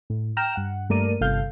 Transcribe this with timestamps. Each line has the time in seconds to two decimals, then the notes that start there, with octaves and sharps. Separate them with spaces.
0.10 A2
0.37 G5 A#5 F6 A#6 E7
0.56 G2 F#5
0.89 G2 A3 A#3 A#4 D5 D#7
1.21 G1 C3 A4 F5 G6